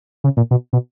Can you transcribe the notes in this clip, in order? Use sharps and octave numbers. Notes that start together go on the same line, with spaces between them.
C#3
A#2
B2
B2